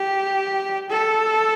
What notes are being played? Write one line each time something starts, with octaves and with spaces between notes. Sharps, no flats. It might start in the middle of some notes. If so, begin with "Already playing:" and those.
Already playing: G4
A4